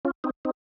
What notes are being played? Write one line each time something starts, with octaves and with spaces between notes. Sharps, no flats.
C#4 F4
C4 D#4
C4 D#4